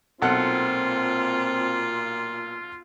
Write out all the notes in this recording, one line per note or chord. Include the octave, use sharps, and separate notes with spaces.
B1 A#2 C4 F4 A4 F#5